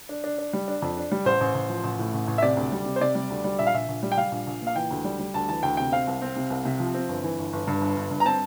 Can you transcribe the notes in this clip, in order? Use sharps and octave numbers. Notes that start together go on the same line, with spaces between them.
D4
D4
D4
G3
D4
F2
D4
G3
A1 C5
A1
A1
F3
A1
A2
A1
A1
E5
C3 D5
D2
G3
C3
C5
C3 D5
G3
D2
G3
A#1 E5
F5
A#1 E5
A#1
G3
G5
G3 F5
A#1
A#1
A#2
F5
E3 G5
D2
G3
G3
D2 A5
E3 A5
D2 G5
C3 G5
C4 F5
C2
C4
C3
C2
C3
F3
C4
G1
E3
G1
G1
G2
G1
G1
G2
A#5
C4 A5